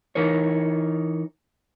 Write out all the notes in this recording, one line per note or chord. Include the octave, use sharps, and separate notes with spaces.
E3 D#4 A#4 C#5